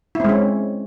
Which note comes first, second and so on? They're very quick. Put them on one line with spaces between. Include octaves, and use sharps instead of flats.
E4 C4 G#3 C#4